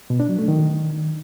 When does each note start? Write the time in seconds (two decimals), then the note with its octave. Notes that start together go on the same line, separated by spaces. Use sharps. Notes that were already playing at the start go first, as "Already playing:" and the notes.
0.10 B2
0.20 D4
0.29 F#3
0.39 A3
0.48 D#3